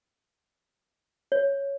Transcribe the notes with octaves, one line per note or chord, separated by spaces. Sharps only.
C#5